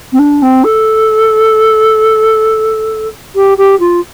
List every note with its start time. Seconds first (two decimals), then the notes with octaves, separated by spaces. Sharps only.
0.13 C4
0.19 D4
0.42 C4
0.64 A4
3.35 G4
3.58 G4
3.80 F4